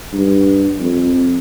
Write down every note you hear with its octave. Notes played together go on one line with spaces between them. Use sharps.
G2
F2